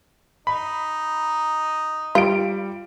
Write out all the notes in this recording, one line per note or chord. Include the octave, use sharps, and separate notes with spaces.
D#4 B5
G3 F4 D7